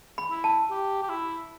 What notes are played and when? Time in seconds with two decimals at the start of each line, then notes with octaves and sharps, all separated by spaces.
0.18 B5
0.31 E4
0.44 A5
0.70 G4
1.02 G4
1.09 E4